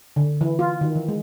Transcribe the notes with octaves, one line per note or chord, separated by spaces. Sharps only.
D3
E3
F4
D#3
E3
G#3